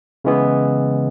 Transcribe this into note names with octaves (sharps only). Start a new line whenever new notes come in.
C#3 E3 G#3 B3